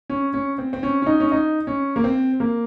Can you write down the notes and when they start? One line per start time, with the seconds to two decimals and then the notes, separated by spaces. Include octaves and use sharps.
0.10 C#4
0.34 C#4
0.58 C4
0.73 C4
0.83 C#4
1.02 C#4
1.07 D#4
1.20 C#4
1.32 D#4
1.67 C#4
1.96 A#3
2.04 C4
2.40 A#3